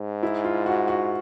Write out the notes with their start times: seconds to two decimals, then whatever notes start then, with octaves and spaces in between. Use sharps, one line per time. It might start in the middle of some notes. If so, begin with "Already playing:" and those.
Already playing: G#2
0.23 E4
0.44 F4
0.66 F#4
0.88 F#4